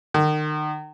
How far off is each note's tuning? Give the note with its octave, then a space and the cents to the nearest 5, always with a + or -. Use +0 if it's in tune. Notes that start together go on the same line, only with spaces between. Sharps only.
D#3 -35